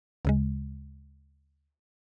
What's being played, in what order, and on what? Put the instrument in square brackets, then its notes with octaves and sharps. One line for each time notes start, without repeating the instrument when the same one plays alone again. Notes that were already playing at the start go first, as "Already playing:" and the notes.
[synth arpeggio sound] D2 C#3 G#3